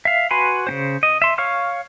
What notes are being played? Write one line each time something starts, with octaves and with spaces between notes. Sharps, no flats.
E5 F5
F#4 B4 G#5 B5 C6
C#3 C#4 C5
D#5
E5 C6
C#5 F5 C#6 F6